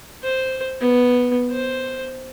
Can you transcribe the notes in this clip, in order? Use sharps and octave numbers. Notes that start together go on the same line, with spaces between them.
C5
B3
C5